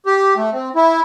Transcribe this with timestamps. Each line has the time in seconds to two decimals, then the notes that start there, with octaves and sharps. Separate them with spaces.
0.06 G4
0.36 A3
0.52 C4
0.75 E4